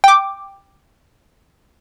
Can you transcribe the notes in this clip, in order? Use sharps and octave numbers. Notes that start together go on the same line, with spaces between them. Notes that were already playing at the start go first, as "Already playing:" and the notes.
G5 D6